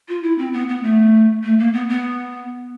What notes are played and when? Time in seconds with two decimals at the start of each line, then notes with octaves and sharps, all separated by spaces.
0.09 F4
0.23 E4
0.38 C4
0.53 B3
0.69 B3
0.83 A3
1.44 A3
1.59 A#3
1.74 B3
1.89 B3